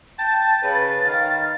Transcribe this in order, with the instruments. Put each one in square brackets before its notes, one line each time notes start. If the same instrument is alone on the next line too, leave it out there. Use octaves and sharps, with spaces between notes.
[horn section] G5 A5 [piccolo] A6
[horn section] C#3 B4
D#3 F5